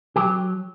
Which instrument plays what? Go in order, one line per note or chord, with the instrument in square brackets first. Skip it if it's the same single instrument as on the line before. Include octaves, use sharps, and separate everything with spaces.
[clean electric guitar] F#3 G4